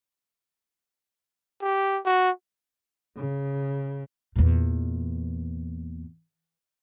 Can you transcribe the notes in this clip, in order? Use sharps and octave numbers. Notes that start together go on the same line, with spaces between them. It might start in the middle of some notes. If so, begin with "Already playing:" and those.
G4
F#4
C#3
E2 A#2